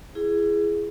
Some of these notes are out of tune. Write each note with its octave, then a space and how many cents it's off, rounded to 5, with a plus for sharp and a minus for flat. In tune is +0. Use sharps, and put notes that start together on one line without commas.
E4 +30 G#4 +0